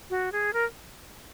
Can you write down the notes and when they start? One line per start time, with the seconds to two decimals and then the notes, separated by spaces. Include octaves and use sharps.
0.10 F#4
0.32 G#4
0.53 A#4